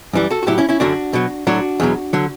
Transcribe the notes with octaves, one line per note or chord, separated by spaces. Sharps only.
F#2 E3 G3
F#4 A4
F#4
A2 F#3 E4 G4
C#4 E4
C#4 E4
F#2 D3 F#3 D4 F#4
B2 F#3
A2 F#3 D4 F#4
E2 B2 F#3
D3 F#3